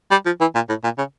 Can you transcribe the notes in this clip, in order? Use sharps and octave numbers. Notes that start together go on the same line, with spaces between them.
G3
F3
E3
A#2
A2
A#2
C#3